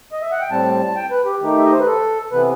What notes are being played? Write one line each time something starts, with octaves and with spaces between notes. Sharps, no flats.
D#5
E5
F#5
G5
A2 G3 C4 A5
A5
G5
B4
G4
D#3 A3 D#4 G4
E5
D#5
C5
B4
A4
C3 E3 B3 B4